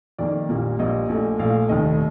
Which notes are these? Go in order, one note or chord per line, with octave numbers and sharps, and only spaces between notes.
F2 D#3 A#3 D5
A#1 A#2 G3 A#3
A#1 A#2 G3 A#3 D#5
A#1 A#2 A3
A#1 A#2 A3 F5
F1 D#2 D#3 A3 D#5